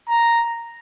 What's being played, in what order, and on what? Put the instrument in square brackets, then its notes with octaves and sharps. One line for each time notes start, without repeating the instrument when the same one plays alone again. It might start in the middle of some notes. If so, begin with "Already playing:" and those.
[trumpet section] A#5